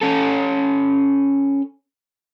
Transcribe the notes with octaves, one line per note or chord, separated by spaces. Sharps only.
C#4 A4